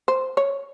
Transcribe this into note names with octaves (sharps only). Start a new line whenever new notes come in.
C5
C#5